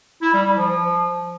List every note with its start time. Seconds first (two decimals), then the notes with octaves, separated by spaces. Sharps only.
0.22 E4
0.34 G3
0.45 G3
0.57 F3
0.69 F3